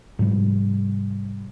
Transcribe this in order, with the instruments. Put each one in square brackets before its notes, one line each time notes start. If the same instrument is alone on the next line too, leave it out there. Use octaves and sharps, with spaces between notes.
[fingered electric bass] G#2 C3 F3 G3